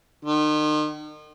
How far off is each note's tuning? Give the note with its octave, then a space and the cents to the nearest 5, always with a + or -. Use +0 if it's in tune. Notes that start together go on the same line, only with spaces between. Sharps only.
D#3 -40